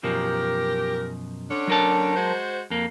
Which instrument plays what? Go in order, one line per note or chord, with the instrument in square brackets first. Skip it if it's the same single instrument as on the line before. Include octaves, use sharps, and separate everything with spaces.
[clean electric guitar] F#2 B2 F3 [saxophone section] G4 A#4
[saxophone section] D3 C#4 D4
[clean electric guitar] F#3 A#4 A5
[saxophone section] G#3 F#4 C5
[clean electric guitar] F2 A#3